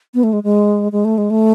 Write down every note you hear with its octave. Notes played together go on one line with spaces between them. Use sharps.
B3
A3
G#3
G#3
G#3
A3
G#3
A3